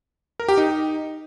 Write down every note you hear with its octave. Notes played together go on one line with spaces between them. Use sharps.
A#4
G4
D#4